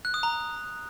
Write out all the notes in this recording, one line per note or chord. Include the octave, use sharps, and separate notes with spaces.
F#6
D#6
A#5